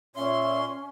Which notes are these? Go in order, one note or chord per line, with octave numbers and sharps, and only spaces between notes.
A#2 C#4 C#5 E5 C6